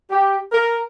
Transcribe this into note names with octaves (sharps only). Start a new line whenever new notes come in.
G4
A#4